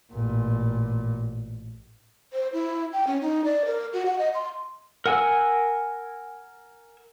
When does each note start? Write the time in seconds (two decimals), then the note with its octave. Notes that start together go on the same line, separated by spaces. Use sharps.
0.12 A1 A#2
2.33 C5
2.53 E4
2.93 G5
3.07 C#4
3.22 D#4
3.45 D5
3.65 A#4
3.93 F#4
4.05 F#5
4.18 D#5
4.34 C6
5.06 A#4 F#5 G#5 E6